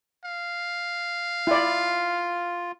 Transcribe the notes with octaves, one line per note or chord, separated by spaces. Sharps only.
F5
E4 F4 D5